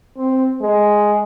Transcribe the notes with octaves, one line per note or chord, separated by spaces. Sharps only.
C4
G#3